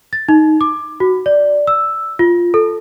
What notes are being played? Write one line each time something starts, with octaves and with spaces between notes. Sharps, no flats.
A6
D#4
D6
F#4
D5
E6
F4
A4